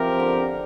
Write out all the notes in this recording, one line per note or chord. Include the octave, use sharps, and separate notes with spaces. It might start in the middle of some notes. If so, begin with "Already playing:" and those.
Already playing: C3 F3 C4 G4 A#4
D3